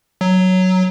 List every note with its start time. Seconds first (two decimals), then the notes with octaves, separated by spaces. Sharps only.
0.21 F#3